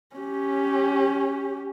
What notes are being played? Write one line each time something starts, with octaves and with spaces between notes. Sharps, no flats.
C#4 G4